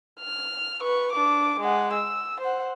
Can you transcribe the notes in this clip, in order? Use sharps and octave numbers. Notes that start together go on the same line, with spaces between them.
F6
B4 C#6
D4 D6
G#3 F#5
E6
C5 F#5